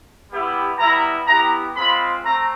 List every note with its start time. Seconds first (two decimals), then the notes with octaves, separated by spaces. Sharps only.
0.30 G3 B3 E4 G4
0.78 G3 B3 E4 A#5
1.27 B3 E4 G4 A#5
1.75 G#3 C4 F4 B5
2.24 A3 C4 A#5